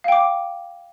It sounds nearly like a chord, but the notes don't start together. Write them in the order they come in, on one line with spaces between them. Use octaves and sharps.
F5 G5 D6